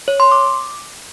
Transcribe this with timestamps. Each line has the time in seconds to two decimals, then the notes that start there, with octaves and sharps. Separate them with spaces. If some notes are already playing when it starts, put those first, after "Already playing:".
0.08 C#5
0.20 C6
0.32 D6